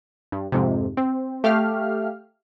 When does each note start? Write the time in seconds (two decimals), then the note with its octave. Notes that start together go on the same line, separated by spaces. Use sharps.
0.32 G2
0.52 F2 G#2 C3
0.97 C4
1.44 A3 G4 F5 F6